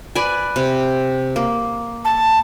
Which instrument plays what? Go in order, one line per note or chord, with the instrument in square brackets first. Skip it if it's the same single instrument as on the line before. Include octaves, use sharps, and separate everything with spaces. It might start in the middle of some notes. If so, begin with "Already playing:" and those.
[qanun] B4 D5 G#5
C3
A#3
[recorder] A5